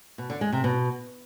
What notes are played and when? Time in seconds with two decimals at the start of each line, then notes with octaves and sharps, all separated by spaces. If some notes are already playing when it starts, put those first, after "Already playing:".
0.18 B2
0.30 D3
0.41 G#3
0.52 C3
0.64 B2